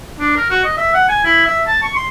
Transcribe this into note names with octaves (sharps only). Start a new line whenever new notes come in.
D4
A#4
F#4
D#5
E5
F#5
G#5
E4
E5
A5
C#6
C6